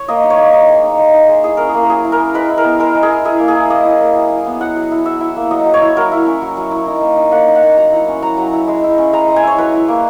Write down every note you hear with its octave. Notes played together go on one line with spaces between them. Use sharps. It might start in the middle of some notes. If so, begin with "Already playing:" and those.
Already playing: C#5
A#3 D#5
D#4
C#5
A#3
D#4
G#3
D#4
G#3
D#4
G#3
E4 G#4
C#4 A#4
G#4
A#3
A#4
F#3 G#4
E4
A#4
C#4
G#3 B4
E4
A#4
B3
G#3 A#4
G#3
G#4
E4
E4 G#4
A#3
G#4
E4
A#3 D#5
E4
A#3
F#3
E4
B3
F#3 F#5
F#3
E4
F#3 E5
E4
A#3
F#3 D#5
F#3
C#5
E4
F#3 A#4
E4
C#4
F#3
F#3
E4
D#4
A#3
D#4
A#3 F#5
D#4
F#5
A#3
F#3 A#5
E4
C#4
F#3 A#5
F#3
E4
G#3
E4
C#4
G#3 A#5
G#3
G#5
E4 C#5
F#3 B4
E4
A#3